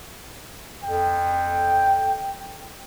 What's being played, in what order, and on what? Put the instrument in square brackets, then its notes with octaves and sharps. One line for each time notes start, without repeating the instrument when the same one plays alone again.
[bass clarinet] F2 [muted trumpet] G5